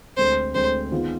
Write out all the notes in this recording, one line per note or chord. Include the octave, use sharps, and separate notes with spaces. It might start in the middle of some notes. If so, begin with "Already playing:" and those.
D2 D3 G#3 C4 C5
D2 D3 G#3 C4 C5
D#3 B3 F4 G#4